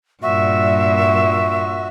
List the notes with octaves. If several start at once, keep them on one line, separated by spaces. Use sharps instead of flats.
G2 A#2 F#4 E5